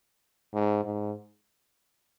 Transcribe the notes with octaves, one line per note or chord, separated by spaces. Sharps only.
G#2
G#2